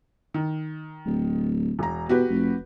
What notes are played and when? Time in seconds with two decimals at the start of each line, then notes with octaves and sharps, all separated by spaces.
0.34 D#3
1.05 D1
1.79 E1 A#5
2.09 B2 F#4 G4 B4
2.30 F1